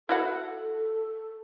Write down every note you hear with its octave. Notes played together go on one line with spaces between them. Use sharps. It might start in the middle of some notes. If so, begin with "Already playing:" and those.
E4 F#4 A4 F#5